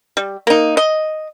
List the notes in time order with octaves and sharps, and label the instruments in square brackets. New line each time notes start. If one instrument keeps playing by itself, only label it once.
[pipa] G3
A#3 D#4
D#5